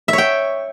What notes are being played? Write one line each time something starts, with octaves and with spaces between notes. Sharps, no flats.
E5
C#5
G5